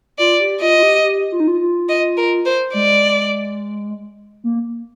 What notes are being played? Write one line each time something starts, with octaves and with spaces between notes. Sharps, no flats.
F4 D5
G4
F4 D#5
F4
G4
G4
F4
D#4
F4
F4
D#5
A#4
C5
G#3 D5
A#3